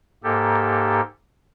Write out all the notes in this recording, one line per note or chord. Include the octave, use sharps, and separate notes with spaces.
G#2 A#3 G4 A4